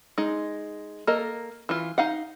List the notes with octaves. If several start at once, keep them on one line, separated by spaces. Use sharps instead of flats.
G#3 D#4
A#3 A4 A#4 D#5
E3 F4
D#4 F5 F#5